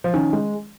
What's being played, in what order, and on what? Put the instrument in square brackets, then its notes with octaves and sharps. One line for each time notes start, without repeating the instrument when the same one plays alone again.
[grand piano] F3
[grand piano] D#3 [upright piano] C#4
[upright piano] G#3